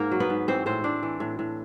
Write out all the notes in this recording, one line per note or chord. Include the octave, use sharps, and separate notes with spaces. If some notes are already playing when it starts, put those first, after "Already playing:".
Already playing: G#2 A#3 A#4
F#3
B3 B4
G#2
E3 C4 C5
A2 C4 C5
A2 D4 D5
E3
A2
A2